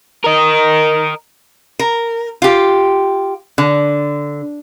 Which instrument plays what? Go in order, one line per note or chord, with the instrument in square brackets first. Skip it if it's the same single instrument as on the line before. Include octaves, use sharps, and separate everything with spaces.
[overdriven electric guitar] A#4 D#5
[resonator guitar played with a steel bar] A#4
F4 G4
D3